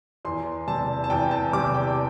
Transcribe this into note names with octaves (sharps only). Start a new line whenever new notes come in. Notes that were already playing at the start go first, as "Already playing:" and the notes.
E2 C6
C3 G3 A5
A5
E2 G5
A5
C3 G3 D6
G5